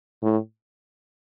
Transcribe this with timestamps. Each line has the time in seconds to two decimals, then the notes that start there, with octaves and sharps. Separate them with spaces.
0.23 A2